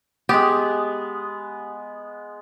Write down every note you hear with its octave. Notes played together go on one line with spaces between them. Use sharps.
G#3 B3 G4